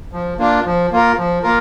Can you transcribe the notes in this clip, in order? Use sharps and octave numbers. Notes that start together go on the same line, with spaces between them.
F3
A#3 D4 F4
F3
A#3 F4 A#4
F3
A#3 F4 A#4